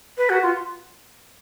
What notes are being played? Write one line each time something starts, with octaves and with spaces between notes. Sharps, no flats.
B4
F#4
F4